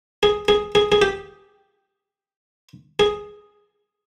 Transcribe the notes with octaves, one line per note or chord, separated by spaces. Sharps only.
G#4
G#4
G#4
G#4
G4
G#4